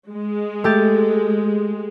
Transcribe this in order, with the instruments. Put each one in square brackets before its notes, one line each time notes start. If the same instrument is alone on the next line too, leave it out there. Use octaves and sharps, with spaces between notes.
[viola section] G#3
[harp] A3 G4 A6